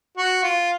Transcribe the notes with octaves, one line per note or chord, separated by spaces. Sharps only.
F#4
F4